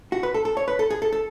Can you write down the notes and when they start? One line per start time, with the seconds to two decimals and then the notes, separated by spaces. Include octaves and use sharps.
0.12 F#4
0.23 B4
0.34 A4
0.45 A4
0.57 C#5
0.68 B4
0.79 A4
0.90 G#4
1.02 A4
1.13 A4